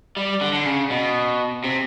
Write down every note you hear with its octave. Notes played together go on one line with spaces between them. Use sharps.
G3
D3
D3
C#3
B2
C3